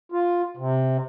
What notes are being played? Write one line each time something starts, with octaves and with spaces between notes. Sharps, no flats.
F4
C3